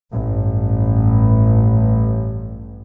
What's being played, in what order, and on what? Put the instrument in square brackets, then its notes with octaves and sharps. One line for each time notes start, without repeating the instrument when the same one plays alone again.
[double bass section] A1 G2